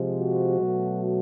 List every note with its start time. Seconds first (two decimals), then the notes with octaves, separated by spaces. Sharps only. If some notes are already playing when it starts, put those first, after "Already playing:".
Already playing: C3 F3 G#3
0.20 F#4
0.61 B2 F#3 A3